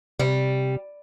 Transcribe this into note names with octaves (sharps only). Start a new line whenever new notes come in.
C3 G3